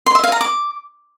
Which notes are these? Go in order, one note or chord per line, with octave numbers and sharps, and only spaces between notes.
C6
E5
F5
A#5
D6